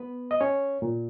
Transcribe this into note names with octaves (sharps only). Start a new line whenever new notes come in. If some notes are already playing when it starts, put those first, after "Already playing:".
Already playing: B3 B4
D#5
C#4 C#5
A#2